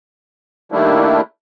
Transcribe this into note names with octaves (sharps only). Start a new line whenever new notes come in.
D#3 G3 A3 A#3 D4 E4